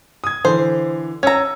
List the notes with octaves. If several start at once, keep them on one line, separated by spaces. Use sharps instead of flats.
D#6 G#6
D3 E3 C5
C#4 A#5 E6 G#6